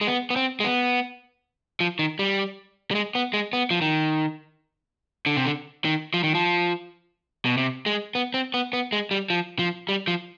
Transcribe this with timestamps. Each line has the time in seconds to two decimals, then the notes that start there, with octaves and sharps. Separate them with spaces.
0.01 G#3
0.07 B3
0.30 B3
0.36 C4
0.60 G#3
0.64 B3
1.80 F3
1.99 D#3
2.19 G3
2.91 G3
2.95 G#3
3.15 B3
3.33 G#3
3.53 B3
3.71 F3
3.82 D#3
5.26 D3
5.37 C3
5.45 D3
5.85 D#3
6.14 F3
6.23 D#3
6.35 F3
7.45 B2
7.57 C3
7.86 G#3
8.15 B3
8.34 C4
8.54 B3
8.73 B3
8.92 G#3
9.11 G3
9.30 F3
9.59 F3
9.89 G3
10.07 F3